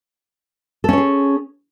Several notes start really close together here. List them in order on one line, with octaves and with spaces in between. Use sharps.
A4 C#4 C#5 G#4